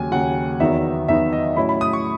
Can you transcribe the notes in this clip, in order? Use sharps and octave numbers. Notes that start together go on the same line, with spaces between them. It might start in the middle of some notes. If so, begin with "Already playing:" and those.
Already playing: D#2 C#3 F#3 G#5
D#2 C#3 F#3 F#5
E2 D#3 F#3 B3 D#4 E5
E2 D#3 F#3 B3 D#4 E5
D#5
A2 F#3 C#4 E4 B5
B5
D#6
C#6